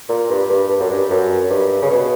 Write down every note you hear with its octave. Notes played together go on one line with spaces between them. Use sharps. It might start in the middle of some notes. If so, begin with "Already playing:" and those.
A#2
G2
G2
G2
F#2
G2
F#2
G2
C#3
B2